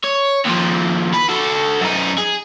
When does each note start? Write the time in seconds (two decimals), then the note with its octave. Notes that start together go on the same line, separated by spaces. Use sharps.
0.04 C#5
0.45 D#2 F3
1.14 B4
1.29 F#4 A4
1.81 F#2 D#4
2.18 G#4